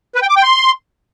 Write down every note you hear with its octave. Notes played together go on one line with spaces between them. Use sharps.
B4
G5
D6
G5
C6